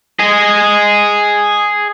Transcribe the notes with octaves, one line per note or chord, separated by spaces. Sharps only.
G#4 D#5